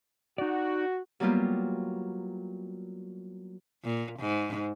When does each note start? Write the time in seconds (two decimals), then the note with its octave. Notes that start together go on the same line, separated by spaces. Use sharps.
0.38 D#4 F#4 D5
1.20 F#3 G3 A#3 B3 F4 G4
3.84 A#2
4.20 G#2